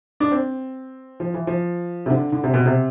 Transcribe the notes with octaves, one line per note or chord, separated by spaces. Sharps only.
D4
C4
F3
E3
F3
C3
D3
D3
C3
B2
C3